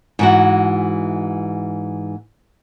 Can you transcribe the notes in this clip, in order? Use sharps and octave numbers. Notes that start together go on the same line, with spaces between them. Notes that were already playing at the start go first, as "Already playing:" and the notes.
G#2 E3 F#4